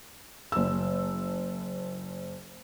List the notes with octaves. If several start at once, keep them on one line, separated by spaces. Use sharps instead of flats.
F#1 E6